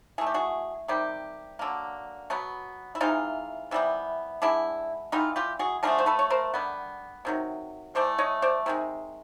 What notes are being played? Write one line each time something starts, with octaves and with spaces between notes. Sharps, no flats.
E3 A3 G#4
G4
F#4 G#4
C3 D#3 G3 G4
D3 F#3 A#3
B2 F#3 B3
E4
C3 E3 G#3 D#4 F4
C3 E3 G3 B3
E3 G#3 B3 D4 E4
E3 G3 B3 D#4 F4
F4 G4
F#4 G#4
D3 F3 A3 G#4 A#4
C5
A4 B4
C#5
A#4 C5
D3 G3 B3
C3 D#3 F#3
E3 A3 C5 D5
C#5 D#5
C5 D5
C3 D#3 G#3